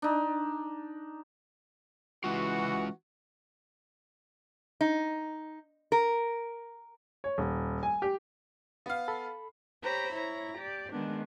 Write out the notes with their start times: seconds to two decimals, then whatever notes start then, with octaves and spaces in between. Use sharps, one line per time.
0.02 D4 D#4
2.24 E3 G#3 C#4 F4 F#4
4.81 D#4
5.92 A#4
7.24 C#5
7.38 D#1
7.83 G#5
8.02 G4
8.86 B3 F5
9.08 A4 B5
9.82 G4 C5 C#5 A#5 B5
10.12 E4 C#5 A#5
10.57 G4 D5
10.91 D#3 G#3 B3 D4